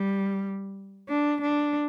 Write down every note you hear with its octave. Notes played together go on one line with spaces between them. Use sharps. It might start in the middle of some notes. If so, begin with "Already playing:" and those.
Already playing: G3
D4
D4